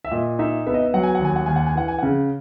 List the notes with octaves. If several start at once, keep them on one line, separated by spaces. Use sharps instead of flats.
E5
A#2 D#5
D#4 E5
B3 E5
D#5
E5
F#3 F#5
G#5
F#5
D#2 G#5
F#5
D#2 G#5
F#5
G#5
E3 F#5
G#5
C#3 F#5